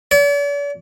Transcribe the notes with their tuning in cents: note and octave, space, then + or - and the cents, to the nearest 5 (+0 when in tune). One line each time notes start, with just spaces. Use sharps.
D5 -45